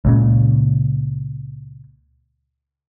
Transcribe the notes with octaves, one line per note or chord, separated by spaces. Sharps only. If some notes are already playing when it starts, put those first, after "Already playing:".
C#2 A#2 C#3